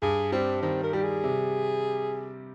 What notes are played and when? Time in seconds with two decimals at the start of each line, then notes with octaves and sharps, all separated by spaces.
0.02 G2 G#4
0.32 G3 C4
0.62 D#3 C4
0.83 A#4
0.93 G3 G4
1.04 G#4
1.24 C3